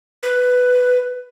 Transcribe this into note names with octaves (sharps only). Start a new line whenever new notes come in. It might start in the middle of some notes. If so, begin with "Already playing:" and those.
B4